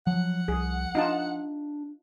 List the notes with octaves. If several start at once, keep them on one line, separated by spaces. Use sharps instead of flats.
F3 F#3 F#5
C2 G#4
D4 D#4 F4 A5